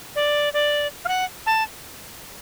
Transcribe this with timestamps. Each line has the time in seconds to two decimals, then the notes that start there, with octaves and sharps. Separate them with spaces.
0.16 D5
0.54 D5
1.05 F5
1.08 F#5
1.46 A5